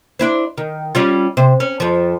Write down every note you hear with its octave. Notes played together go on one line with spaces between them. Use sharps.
D4 E4 C5
D#3
G3 C#4 F4
C3 C5
C#4
F2 F3